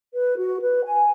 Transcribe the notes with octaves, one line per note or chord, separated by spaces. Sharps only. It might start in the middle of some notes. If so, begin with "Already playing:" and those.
B4
F#4
B4
G#5